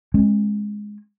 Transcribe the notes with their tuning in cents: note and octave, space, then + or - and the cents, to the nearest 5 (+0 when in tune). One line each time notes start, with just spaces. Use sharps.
G#3 +0 C#4 -45